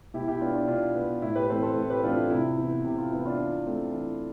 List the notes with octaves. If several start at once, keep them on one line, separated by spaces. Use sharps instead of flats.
B2 E4 G4
E4 G4
B3 D4 F4
D4 F4
B2 D4 F4
B3
A2 E4
G4 B4
E3 A3 C4 A4 C5
A4 C5
A2
G4 B4
E3 A3 C4 D4 F4
E4
C3 E4
E3 B3
C3 G4
F4
E3 B3 E4
D4 F4
E3
A3 C4
E3